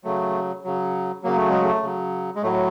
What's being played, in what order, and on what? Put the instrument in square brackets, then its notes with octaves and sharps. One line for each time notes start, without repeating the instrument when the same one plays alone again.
[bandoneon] C#3 F#3 A3
C#3 F#3
C#3 F#3 A#3
A3
G#3
A3
C#3 F#3
G#3
A2 F#3 A3